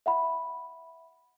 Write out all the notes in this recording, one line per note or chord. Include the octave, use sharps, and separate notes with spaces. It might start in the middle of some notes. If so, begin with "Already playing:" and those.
E5 F#5 B5